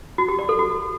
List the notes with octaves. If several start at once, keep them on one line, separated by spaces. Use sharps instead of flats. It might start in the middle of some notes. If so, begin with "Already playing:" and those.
F#4
G4
D5
A4
F#4